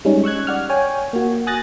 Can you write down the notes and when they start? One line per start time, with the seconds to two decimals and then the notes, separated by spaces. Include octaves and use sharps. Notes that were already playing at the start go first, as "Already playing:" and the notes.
0.05 G3 G#3 C#4 D#4
0.24 C#6 E6 F#6 G#6
0.47 D5 F#5 F6
0.70 C#5 G5 G#5
1.13 A#3 F#4
1.47 G#5 D#6 F#6 A6 A#6